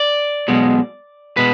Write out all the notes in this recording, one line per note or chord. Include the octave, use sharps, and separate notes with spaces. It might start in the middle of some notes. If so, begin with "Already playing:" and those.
Already playing: D5
B1 B2 G#3
B2 G#3 B4